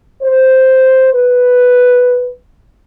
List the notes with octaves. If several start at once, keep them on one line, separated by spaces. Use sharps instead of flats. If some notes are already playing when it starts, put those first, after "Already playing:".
C5
B4